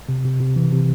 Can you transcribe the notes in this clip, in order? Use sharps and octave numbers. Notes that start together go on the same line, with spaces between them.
C3
C3
C3
E3
C3